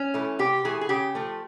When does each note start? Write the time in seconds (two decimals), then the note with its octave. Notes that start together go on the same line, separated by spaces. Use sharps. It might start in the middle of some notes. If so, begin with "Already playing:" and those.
Already playing: C#4
0.14 E3 A3
0.39 C3 G4
0.65 E3 A3 G#4
0.81 G#4
0.89 C#3 G4
1.15 F3 A3